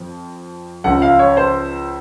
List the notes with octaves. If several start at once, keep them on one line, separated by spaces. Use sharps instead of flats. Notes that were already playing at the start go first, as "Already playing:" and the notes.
Already playing: F2
C#2 C#3 F3 F#5
F5
C#5
C5